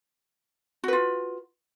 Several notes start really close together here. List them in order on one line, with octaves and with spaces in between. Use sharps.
F#4 B4 F4